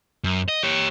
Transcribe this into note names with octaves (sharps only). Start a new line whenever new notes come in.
F#2
D#5
G4 C#5